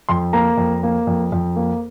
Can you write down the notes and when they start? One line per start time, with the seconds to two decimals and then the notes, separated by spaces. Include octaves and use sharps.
0.09 F2 C6
0.33 A#3 A#5
0.58 F2
0.83 A#3
1.07 F2
1.32 F2
1.56 A#3